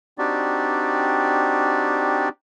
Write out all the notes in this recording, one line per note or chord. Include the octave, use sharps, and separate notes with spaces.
C4 D4 D#4 F#4 G4 D5